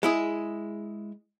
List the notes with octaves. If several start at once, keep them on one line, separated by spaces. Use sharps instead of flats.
G#3 E4 G#4